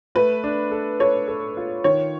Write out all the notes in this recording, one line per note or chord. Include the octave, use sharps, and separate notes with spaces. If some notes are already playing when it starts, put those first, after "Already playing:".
A3 B4
D4
A4
A4 C#5
A4
F4
D#3 C#5